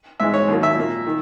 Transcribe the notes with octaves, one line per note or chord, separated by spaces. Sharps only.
G#2 E3 G#3 E5
C#5
D#2 D#3 F#3 A#3
E5
A#2 A#3
D#3